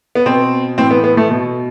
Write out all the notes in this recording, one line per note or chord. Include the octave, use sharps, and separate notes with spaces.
B3
B2 C4
A2 E3 C4
B3
B3
A3
B2